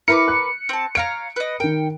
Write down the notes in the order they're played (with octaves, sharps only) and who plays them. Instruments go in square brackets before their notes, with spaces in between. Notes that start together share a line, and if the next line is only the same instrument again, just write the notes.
[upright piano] E4 [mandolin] A#4 B4 D6 [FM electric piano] C#7
[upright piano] F#6
[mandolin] C4 A5
[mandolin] C#5 F5 A#5 [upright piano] D7
[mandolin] B4 D#5
[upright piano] D#3 A#4 [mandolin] G5